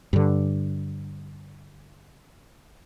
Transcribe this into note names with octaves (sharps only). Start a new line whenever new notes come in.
G2 D3